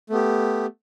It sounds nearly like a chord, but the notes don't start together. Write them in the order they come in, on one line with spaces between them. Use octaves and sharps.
A3 B3 G4